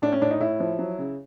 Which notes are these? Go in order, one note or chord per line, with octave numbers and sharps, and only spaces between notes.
A2 D4
C#4
A2 D4
D#4
A2 E4
F3
F#3
C#3